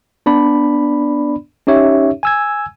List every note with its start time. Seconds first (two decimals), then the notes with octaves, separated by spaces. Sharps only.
0.26 B3 D4 D5 B5
1.67 C#4 D#4 G4 C#5 E5
2.23 G#5 E6 G#6